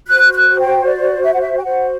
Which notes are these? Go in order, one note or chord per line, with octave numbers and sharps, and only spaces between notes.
F#4 C5 F#6
F#6
G5
D5
E5
F#5
E5
G5
F#4 C5 F#5